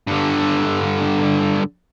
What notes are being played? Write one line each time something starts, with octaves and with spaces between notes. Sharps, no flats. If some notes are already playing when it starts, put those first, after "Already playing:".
G2 D3